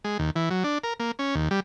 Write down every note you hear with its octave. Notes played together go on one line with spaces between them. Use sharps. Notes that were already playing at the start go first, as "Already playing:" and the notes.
G#3
D#2
E3
F#3
D4
A#4
A#3
C#4
D#2
G3